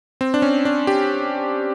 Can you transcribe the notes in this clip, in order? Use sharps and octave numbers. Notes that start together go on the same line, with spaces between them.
C4
D4
C#4
D4
G4